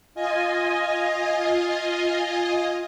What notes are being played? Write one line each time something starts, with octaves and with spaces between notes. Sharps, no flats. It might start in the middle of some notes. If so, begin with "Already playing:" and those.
F4 D#5 G#5